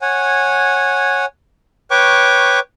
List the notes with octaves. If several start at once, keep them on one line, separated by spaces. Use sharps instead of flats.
C#5 F#5 G#5
B4 C#5 G5 C#6 D6